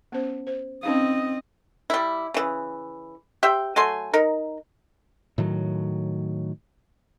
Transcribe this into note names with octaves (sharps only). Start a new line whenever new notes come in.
B3 C#4 C5
C5
C4 C#4 D#4 D#5 F5
G3 E4
C#3 E3
G4 C5 E5 G5
F#3 A3 G#5 C6
D#4 A#4
A2 D#3 F#3